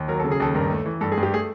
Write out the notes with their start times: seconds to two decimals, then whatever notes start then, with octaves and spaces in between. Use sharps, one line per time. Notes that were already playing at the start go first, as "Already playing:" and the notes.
Already playing: D#2
0.08 F#3 A#4
0.20 C#3 A4
0.32 G#4
0.40 D#2 A4
0.55 G2 A#4
0.70 A3
0.86 E3
1.01 G2 A4
1.12 G#4
1.17 G2
1.23 G4
1.32 A3 G#4